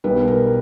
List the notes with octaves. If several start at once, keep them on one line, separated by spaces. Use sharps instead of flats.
B1 B2 G3 B3 B4
A#4